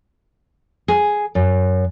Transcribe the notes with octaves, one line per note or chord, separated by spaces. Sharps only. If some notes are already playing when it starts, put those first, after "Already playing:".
G#4
F#2